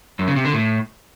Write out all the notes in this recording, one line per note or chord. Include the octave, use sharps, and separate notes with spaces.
F#2
C#3
C3
D3
A2